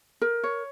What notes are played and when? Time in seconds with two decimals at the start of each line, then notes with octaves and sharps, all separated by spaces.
0.21 A#4
0.44 C#5